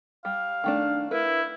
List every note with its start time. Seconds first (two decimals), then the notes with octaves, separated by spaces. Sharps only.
0.25 G3 F5
0.64 D#3 A3 D4
1.11 E4 A#4 B4